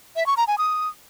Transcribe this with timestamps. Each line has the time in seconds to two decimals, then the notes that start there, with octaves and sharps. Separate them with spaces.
0.16 E5
0.26 C#6
0.37 A#5
0.47 G#5
0.58 D#6